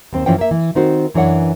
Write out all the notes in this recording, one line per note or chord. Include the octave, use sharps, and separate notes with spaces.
D#2 C4 C5
G2 E3 F3 C#4 C5 G5
A#3 E5
E3
D#3 C4 D#4 F#4 C5
F#2 E3 D4 C#5 F#5